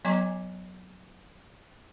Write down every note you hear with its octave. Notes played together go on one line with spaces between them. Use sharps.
F#3 B3 D#5 G#5 A#5 D6